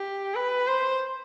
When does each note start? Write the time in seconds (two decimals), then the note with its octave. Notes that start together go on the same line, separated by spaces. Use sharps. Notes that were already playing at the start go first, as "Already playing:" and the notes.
Already playing: G4
0.35 B4
0.67 C5